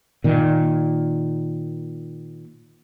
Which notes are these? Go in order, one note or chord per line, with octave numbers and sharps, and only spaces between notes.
A#2 D#3